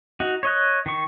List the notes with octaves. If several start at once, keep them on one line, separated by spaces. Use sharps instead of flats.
D#4 F#4
C#5 D#5 F#6
D#3 C#6